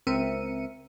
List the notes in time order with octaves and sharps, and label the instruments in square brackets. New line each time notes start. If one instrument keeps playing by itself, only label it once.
[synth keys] C#2 C4 A#4 E5 C#7 D#7